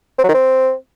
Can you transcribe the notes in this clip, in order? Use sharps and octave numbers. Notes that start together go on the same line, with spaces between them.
C4
F#3
D#3
C4